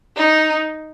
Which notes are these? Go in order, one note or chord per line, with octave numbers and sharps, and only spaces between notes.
D#4